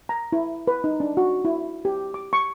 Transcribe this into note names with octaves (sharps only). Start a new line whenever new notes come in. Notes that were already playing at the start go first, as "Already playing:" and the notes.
A#5
E4
B4
D#4
D4
F#4
E4
G4
D6
C#6